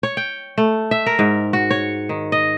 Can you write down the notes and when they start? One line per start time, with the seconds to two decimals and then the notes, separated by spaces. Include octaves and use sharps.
0.03 C#5
0.17 G5
0.58 A3
0.91 E5
1.06 A#4
1.19 G#2
1.53 F#4
1.70 C#5
2.09 D#3
2.32 D#5